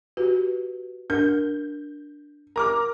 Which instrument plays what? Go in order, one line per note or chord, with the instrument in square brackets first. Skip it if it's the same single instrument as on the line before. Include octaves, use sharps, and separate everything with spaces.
[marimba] F#4 [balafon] G4 B4
[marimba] D4 A#4 F6 [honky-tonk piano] G6
[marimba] A#4 [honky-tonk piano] A#5 D6 F6